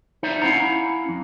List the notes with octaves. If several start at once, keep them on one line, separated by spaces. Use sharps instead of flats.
D#4 C5 D5 E5
C#4 E4 F5 F#5 A#5
F2